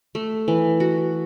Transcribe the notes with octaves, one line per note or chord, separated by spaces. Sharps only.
A3
E3
F#4